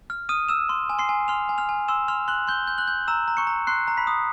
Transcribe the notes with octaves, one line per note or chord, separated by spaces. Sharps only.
F6
D#6 F6 D#7
E6 F6 E7
C6
G#5
C6 C7
G#5
C6 F6 F7
G#5
F6 F7
G#5
C6 E6 E7
C6 F6 F7
C6 F#6 F#7
C6 G6 G7
G6
F#6 F#7
G6
A#5 E6 E7
A#5
C#6 C#7
A#5
C6 F#6 C7
A#5
B5 B6
D#6